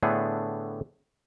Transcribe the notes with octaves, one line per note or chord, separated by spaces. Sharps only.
A2 D3 A3 B3 D4 G#4